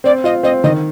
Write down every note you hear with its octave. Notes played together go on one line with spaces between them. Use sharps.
C4 D5
F4 D#5
C4 D#5
D#3 D#5